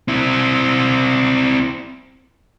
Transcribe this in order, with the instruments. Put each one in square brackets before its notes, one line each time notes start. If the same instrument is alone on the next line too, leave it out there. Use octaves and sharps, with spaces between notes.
[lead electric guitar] C4 E4